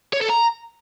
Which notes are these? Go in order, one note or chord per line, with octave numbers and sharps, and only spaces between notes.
C#5
A4
A#5